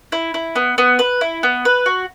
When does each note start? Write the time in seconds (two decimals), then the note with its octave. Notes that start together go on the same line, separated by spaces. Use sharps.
0.12 E4
0.34 E4
0.56 B3
0.78 B3
0.99 B4
1.21 E4
1.43 B3
1.65 B4
1.86 F#4